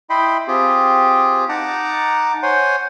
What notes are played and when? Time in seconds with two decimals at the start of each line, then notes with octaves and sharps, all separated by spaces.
0.10 E4 D#5 G5 B5 C6
0.48 C4 F4 G4 G#4
1.49 D#4 F#5 A5 A#5 D6
2.43 C5 C#5 F#5 G#5 C6